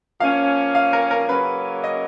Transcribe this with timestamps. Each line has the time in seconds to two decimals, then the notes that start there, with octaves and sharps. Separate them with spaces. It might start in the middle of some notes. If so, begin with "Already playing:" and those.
0.20 F3 A#3 C#4 F5
0.75 F5
0.93 A#4
1.11 A#4
1.28 C#3 F#3 A#3 C#4 B4
1.84 D#5